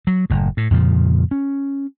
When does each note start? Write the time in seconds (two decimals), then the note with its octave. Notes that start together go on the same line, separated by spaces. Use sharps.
0.07 F#3
0.30 F#1 A2
0.57 A2
0.71 F2 A#2 C#3 F3
1.31 C#4